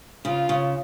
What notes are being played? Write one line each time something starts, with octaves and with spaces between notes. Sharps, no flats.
C#3 F4
C#3